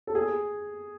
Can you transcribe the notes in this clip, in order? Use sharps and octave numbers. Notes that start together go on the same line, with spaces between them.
A4
G#4